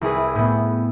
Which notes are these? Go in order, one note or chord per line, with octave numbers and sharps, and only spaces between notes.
C2 E4 G#4 B4
A2 B3